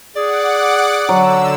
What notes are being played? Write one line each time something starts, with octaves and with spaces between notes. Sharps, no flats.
G#4 D5 F#5 D6
D3 F#3 E6